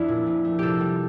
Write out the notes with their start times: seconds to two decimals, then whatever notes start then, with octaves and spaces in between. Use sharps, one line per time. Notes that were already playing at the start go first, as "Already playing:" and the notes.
Already playing: F2 D4 E4
0.08 A#2
0.26 F3
0.45 A3
0.59 C3 G4 A4
0.80 G3